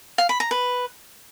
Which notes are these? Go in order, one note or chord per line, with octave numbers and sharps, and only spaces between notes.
F5
B5
A#5
B4